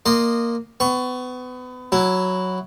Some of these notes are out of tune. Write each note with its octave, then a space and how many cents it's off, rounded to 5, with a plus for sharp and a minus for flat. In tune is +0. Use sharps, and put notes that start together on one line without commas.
A#3 +0 D#5 -20 C6 +0
B3 +30 C#6 +0
F#3 +0 E4 +0